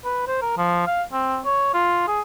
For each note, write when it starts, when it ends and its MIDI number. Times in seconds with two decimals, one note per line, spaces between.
0.05 0.23 71
0.27 0.40 72
0.42 0.55 70
0.57 0.84 53
0.87 1.03 77
1.13 1.40 60
1.45 1.70 73
1.74 2.03 65
2.08 2.21 68